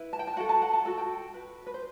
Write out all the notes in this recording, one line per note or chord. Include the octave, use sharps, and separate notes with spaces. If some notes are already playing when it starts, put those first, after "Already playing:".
Already playing: E4 B4
A5
G5
A5
F#4 A4 F#5
A5
F#5
A5
F#4 A4 A5
G5
F#4 B4
B4
C5